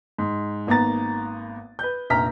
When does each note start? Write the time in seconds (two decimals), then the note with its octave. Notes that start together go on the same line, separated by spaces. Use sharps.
0.18 G#2
0.67 G#1 A#3 B3 A#5 A6
1.79 B4 G6
2.10 F1 A#1 A#5 F6 B6